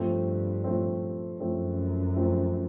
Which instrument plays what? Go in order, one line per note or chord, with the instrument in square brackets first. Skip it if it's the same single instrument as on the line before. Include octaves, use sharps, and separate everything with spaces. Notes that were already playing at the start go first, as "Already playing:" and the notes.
Already playing: [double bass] G2 [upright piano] F3 A3 C4
[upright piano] F3 A3 C4
[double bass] F#2 [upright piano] F3 A3 C4
[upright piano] F3 A3 C4